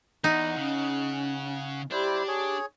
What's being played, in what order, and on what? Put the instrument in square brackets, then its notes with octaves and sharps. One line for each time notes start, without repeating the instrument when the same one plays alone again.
[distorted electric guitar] E2 [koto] D#4 [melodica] F#5
[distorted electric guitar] C#3 [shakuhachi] C#4
[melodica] G3 E4 C5 [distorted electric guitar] D4 [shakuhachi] G4
[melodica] G#4 C#5